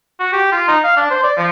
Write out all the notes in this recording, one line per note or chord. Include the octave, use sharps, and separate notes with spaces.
F#4
G4
F4
D#4
F5
D4
C5
D5
F3